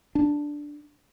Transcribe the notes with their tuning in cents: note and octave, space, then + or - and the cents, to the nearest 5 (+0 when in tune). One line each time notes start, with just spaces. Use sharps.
D4 +0